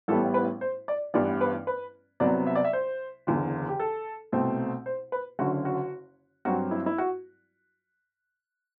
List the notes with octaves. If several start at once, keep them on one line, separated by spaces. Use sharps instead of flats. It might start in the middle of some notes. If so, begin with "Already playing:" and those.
A1 A2 G3 B3 A4
B4
C5
D5
A1 G2 E3 G3 B3 D5
B4
B4
C2 C3 F#3 B3 D5
E5
D5
E5
C5
F#1 E2 D3
G4
A4
C2 B2 A3 C4
C5
B4
F#1 F#2 D3 F#4
F#4
G2 F#3 C4 F#4
E4
E4
F#4